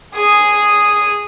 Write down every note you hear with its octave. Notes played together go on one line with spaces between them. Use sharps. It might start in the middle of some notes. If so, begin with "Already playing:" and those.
G#4 D#6